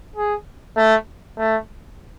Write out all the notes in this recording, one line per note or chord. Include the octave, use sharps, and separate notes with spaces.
G#4
A3
A3